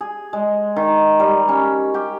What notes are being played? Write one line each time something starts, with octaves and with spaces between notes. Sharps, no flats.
G#4
G#3
D#3
G3
C#4
G4